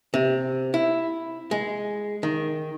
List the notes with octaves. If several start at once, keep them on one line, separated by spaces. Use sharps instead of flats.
C3
E4
G#3
D#3